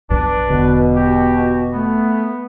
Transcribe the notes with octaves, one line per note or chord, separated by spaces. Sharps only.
B1 G2 F#3 D4 B4
E1 B2 D3
F#4 G4
A3 B3